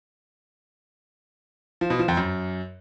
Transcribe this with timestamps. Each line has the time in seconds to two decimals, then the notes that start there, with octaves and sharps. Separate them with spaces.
1.81 F3
1.90 B2
1.99 F3
2.08 F2
2.17 F#2